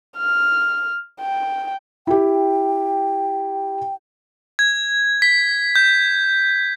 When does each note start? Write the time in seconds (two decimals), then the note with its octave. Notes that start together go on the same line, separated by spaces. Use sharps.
0.17 F6
1.21 G5
2.07 E4 G4 G5
4.59 G#6
5.22 B6
5.76 G6